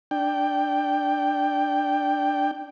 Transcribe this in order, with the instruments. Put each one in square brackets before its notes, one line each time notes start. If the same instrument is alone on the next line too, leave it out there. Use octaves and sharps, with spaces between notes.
[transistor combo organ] D4 G5